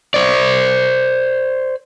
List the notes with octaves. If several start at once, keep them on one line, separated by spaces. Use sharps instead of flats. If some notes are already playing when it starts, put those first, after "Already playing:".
C5 D5